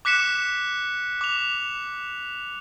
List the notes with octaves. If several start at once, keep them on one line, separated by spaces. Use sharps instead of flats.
D6 F#6 B6 C#7 E7
D6 F7